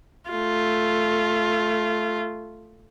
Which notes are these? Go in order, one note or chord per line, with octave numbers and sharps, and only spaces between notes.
A3 F4